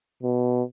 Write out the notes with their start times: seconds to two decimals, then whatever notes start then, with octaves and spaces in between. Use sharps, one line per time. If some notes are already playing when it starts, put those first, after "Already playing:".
0.23 B2